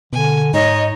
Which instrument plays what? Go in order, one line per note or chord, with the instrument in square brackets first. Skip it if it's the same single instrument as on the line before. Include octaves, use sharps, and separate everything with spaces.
[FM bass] B2 [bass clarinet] D3 [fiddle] G#5
[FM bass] G#2 [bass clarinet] D#4 [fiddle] C#5 [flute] D#5